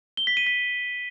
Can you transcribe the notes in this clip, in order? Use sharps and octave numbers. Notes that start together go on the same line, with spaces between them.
G7
B6
D#7
B6